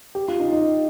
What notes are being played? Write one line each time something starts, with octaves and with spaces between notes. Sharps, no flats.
G4
F4
D#4
D#4